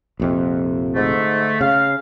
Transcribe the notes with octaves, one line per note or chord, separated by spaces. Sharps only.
A#1 F2 C3
G#2 D3 A3
C#3 F5